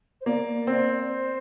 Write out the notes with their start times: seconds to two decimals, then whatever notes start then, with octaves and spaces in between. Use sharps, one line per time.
0.21 C5
0.26 A#3 D5
0.67 C4
1.06 C5